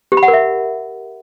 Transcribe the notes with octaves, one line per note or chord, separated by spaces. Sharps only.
G4
B5
F#5
A#4
E5